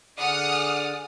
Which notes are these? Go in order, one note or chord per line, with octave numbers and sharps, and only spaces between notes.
D3 G#4 D5 F#5 D#6 F6